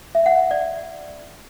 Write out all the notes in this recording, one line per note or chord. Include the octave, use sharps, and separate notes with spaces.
E5
F#5
D5